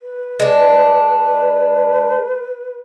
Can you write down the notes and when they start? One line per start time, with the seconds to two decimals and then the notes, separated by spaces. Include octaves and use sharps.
0.02 B4
0.40 G#3 D4